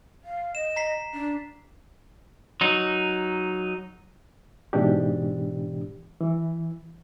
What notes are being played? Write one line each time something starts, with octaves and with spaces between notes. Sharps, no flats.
F5
D#5 E7
A#5 B6 C7
D4
F#3 D#4
G#2 B2 E3 D4 G4
E3